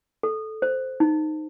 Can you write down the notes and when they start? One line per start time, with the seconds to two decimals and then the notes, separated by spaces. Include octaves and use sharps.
0.23 A4
0.62 C5
1.00 D#4